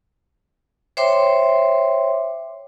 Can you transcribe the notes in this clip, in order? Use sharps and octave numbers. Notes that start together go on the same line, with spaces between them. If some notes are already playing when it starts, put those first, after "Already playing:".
C5 C#5 E5 G5 C6 D6